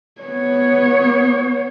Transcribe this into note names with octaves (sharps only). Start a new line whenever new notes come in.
B3 C#5